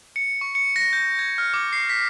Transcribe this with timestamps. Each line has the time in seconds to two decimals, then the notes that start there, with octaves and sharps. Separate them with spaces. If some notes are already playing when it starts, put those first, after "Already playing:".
0.16 C#7
0.41 C#6
0.55 C#7
0.76 A#6
0.93 G6
1.19 G#6
1.38 F6
1.54 D6
1.73 C7
1.89 B6